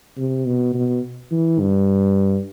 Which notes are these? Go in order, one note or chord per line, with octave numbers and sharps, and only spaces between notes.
C3
B2
B2
E3
G2